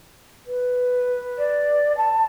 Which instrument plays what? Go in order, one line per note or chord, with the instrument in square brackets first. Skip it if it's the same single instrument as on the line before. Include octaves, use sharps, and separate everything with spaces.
[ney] B4
[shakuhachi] D5
A5